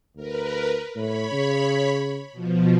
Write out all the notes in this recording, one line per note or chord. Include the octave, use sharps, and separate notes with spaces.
D2 A#4 B4
A2 C#5 B5
C#3
B2 F3